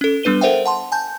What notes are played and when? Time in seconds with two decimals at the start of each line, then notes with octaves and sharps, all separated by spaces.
0.01 C#4 A4
0.23 G3 B3 D4 B4 D#7 G7
0.41 A4 A#4 C5 E5 F#5 G5
0.66 F#5 A5 C6
0.92 G#5 A5 G6